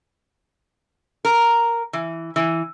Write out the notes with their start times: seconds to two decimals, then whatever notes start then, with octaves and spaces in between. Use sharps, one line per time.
1.25 A#4
1.93 E3
2.36 E3